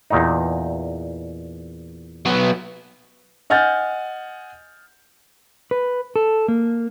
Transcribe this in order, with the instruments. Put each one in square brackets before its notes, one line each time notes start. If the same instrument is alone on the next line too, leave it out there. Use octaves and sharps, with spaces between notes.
[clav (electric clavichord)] E2 A#2 D#4
[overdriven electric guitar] F#3 B3
[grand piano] D#5 F#5 G#5 F6 G6 A6
[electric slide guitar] B4
A4
A#3